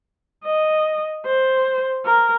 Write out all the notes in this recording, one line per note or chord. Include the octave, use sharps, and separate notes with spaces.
D#5
C5
A#4